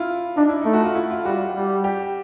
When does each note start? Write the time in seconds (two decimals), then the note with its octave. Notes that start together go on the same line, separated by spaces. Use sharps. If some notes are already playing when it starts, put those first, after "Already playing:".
Already playing: E4 F4
0.37 D4 D#4
0.49 E4
0.62 A3 D#4
0.73 F#4
0.84 F4
0.95 E4
1.10 F4
1.25 G3 F#4
1.55 G3
1.84 G4